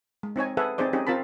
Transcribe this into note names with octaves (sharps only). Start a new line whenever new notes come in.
G#3
C4 D#4 C#5 G#5
G#4 A4 B4 E5 F#5
C4 D#4 G#4 C5 D5
C4 C#4 D#4 G4 G#4
C4 F4 A#4 A5 B5